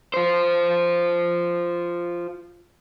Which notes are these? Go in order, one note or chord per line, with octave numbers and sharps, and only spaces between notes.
F4 C5